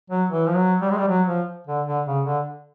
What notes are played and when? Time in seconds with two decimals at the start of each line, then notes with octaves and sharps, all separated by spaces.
0.10 F#3
0.30 E3
0.47 F3
0.56 F#3
0.82 G3
0.91 G#3
0.98 G3
1.08 F#3
1.27 F3
1.67 D3
1.87 D3
2.07 C#3
2.26 D3